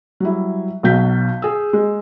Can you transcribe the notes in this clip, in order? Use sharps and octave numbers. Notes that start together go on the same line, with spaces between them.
F#3 G3 E4
B1 B2 F#3 G6 B6
G#4 E6
G#3